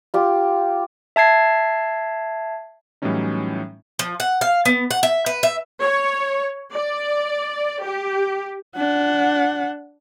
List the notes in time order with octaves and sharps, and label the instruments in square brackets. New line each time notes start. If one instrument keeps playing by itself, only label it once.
[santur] F4 G4
[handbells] E5 A5 G#6 C7
[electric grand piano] A2 E3 F#3 G3 C#4 D#4
[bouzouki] F3
F#5
F5
B3
F#5
E5
B4
E5
[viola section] C#5
D5
G4
[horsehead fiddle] D4 F#5